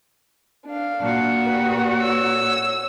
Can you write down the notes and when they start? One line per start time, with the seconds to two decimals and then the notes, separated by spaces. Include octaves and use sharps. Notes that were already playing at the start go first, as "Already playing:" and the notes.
0.66 D4 F5
1.01 A#2 F#4
1.45 G4 B4
1.97 C#5 E6